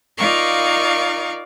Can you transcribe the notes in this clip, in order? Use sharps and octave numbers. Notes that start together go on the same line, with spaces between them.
D#4 F4 A#4 D5 F5 C#6